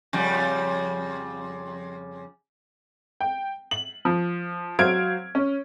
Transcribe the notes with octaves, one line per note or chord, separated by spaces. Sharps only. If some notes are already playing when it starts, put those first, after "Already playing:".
F2 C#3 G3
G5
F#7
F3
F#3 C5 F5 F6 G#6 D7
C#4